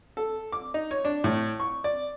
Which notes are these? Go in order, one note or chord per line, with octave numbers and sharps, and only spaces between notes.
A4
D6
D#4
C#5
D4
A2
C#6
D5